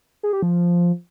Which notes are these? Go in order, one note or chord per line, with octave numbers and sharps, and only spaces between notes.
G#4
G4
F3